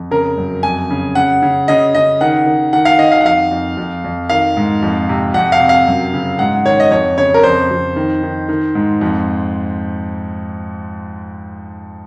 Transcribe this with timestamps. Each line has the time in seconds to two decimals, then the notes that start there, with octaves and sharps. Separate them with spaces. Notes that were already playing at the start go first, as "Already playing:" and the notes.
Already playing: F2
0.11 C#3 A#4
0.38 F#2
0.63 F2 G#5
0.90 C#3
1.15 C#3 F#5
1.42 C#3
1.68 C#3 D#5
1.95 C#3 D#5
2.21 D#3 F#5
2.46 D#3
2.73 D#3 F#5
2.85 F5
2.98 D#3 D#5
3.12 F5
3.21 F#5
3.25 F2 F5
3.51 F2
3.77 F2
4.04 F2
4.30 D#3 F5
4.57 G#2
4.83 F2
5.09 C3
5.34 F2 F#5
5.52 F5
5.60 C3
5.69 F5
5.87 F#2
6.13 C#3
6.39 G#2 F#5
6.65 D#3 C#5
6.80 D#5
6.91 F2 C#5
7.18 C#3 C#5
7.34 A#4
7.43 F2 C5
7.71 F2
7.96 D#3
8.23 D#3
8.49 D#3
8.75 G#2
9.01 F2